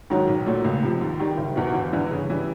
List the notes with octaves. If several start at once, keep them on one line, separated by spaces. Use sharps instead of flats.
G#2 D#3 F#3
B1
A#2 F#3 A3
C#2
C3 F3
D#2
D#3 G3
F#1
E2 B2
G1
G2 E3
C#3
E3 G3